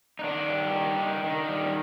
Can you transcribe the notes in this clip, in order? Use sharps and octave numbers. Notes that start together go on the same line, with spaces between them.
D#4
D#3 D4
G3
D#3
D#3
D#3
G3